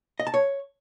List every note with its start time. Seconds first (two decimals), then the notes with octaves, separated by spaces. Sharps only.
0.20 D#5
0.27 A5
0.34 C#5